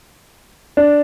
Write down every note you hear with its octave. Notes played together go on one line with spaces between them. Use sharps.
D4